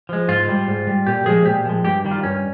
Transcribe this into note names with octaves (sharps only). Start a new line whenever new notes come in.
F3 G#3
G#2 F4
G3
G#2
G3
A#2 G4
F3 G#3 G#4
A#2 G4
F3 G#3
G2 G4
D#3 G3
F4
G2 C#4